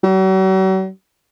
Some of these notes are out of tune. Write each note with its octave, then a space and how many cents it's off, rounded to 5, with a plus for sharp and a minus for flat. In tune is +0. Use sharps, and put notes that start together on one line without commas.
F#3 +45